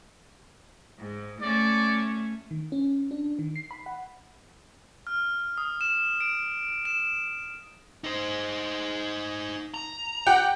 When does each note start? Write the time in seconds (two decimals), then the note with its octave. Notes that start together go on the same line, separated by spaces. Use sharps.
0.98 G#2
1.42 A3 C#4 D5
2.51 D#3
2.72 C#4
3.11 D4
3.39 D#3
3.56 C7
3.71 B5
3.86 F#5
5.07 F6
5.58 D#6
5.81 E7
6.21 D7
6.85 E7
8.04 D#4 C5
9.74 A#5
10.26 G4 F#5 G5